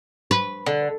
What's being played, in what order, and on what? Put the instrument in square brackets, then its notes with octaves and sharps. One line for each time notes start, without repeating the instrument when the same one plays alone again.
[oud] B4
[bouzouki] D3